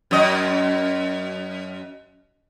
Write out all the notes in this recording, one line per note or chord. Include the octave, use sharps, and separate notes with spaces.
F#2 D#5